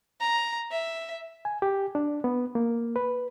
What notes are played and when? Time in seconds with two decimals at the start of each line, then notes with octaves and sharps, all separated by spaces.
0.20 A#5
0.71 E5
1.45 G#5
1.62 G4
1.95 D4
2.24 B3
2.55 A#3
2.96 B4